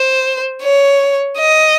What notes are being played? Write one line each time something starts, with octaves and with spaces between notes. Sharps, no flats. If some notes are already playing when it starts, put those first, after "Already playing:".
Already playing: C5
C#5
D#5